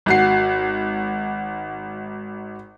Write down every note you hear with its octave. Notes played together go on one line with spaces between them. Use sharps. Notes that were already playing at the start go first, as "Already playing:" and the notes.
G#1 F#4 C7